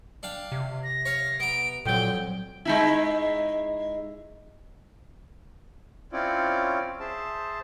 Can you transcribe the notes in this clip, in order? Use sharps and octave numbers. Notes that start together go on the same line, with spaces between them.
D4 F5 G5
C3
A#6
C#5 F5
B3 A#5 D7
F2 A#2 F#3 G5
G#3 D#4 E4
C4 C#4 E4 F4 C#5 D5
G#4 C5 E5 A5